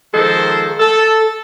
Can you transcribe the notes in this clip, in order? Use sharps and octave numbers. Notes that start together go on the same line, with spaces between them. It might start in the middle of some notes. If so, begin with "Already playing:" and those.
D#3 F3 G#3 A4 C5
A4